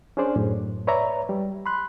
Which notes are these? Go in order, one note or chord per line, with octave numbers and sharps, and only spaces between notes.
C#4 D4 G#4 C5 D5
F#2 A2
B4 C#5 D5 E5 A#5
G3
B5 C6 F#6